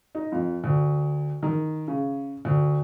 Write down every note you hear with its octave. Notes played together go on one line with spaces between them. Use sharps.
D#4
F2
D2
D#3
C#3
D2